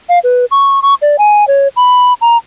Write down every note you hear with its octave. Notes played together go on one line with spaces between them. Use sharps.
F5
B4
C#6
C#6
D5
G#5
C#5
B5
A#5